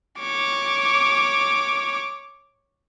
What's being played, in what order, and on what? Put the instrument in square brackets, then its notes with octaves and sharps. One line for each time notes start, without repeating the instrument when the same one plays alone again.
[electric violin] C#5 D6